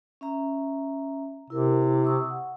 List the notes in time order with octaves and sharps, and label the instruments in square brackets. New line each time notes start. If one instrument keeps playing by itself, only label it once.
[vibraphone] C#4 E5 A#5
[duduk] C3 [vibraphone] E4 A#4
[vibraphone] E4
C#6 D#6 E6
F#5